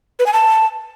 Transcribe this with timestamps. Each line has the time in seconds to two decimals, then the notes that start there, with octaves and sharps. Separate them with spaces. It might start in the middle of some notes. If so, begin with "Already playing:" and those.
0.19 B4
0.26 G#5
0.33 A5